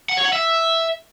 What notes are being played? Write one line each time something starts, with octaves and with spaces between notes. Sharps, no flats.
F#5
C#5
F#5
E5